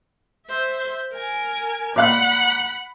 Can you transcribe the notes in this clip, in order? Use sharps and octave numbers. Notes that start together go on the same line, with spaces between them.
C5 E5
A#4 G#5
A#2 F5 F#5 B5 F#6